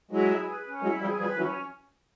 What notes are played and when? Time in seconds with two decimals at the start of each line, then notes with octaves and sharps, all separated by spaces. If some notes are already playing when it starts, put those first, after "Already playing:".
0.11 F#3 G#3 E4
0.29 G#4
0.47 B4
0.65 C#4
0.82 F#3 G#3 E4
1.01 F3 G3 G#4
1.19 F3 G3 B4
1.37 E3 F#3 C#4